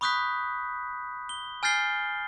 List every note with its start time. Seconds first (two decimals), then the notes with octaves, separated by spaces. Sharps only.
0.01 B5 C#6 D#6 F#6 G6 B6
1.29 G7
1.63 G#5 F6 G6 A6 C7 G7